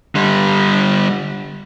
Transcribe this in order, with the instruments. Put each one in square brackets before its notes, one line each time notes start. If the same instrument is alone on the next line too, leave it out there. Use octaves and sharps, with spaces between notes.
[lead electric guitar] D3 G3